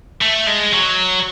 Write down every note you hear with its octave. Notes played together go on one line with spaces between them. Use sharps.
A3
G#3
F#3